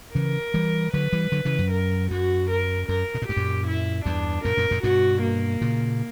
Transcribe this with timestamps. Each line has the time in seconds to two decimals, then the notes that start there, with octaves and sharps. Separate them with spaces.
0.15 C#3 E3 A#4
0.54 E3 G3
0.94 D3 F#3 B4
1.13 E3 G3
1.32 D3 F#3
1.45 C#3 E3
1.58 F#2
1.71 A#4
2.11 F#2 F#4
2.50 A#4
2.89 F#2 A#4
3.15 B2
3.22 A#2
3.28 G2 G4
3.36 F#2 A#2
3.67 E4
4.05 E2 G2 D4
4.45 F#2 A#2 A#4
4.57 F#2 A#2
4.71 F#2 A#2
4.83 G2 B2 F#4
5.22 A#3
5.61 A#2 C#3